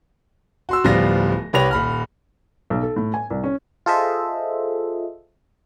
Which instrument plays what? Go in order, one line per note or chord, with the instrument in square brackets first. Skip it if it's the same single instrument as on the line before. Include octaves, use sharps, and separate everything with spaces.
[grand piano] F#4 C6 E6
D1 F3 G3 B3 F4 A#6
C2 G4 B4 C#5 A#6 F7
D#1 B5 F6
[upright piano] B1
A4
A2
G#5
C2
C#4
[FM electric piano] F4 G#4 A4 C5 D#5 E5